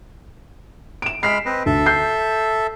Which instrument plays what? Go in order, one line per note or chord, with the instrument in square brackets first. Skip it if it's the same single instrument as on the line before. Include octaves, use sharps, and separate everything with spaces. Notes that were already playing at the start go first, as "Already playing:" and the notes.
[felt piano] D7 E7
[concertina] G#3 B5 F6 [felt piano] B6 C7
[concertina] C4 B4 D#5
[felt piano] D2 [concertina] A4 E5
[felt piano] G6 C7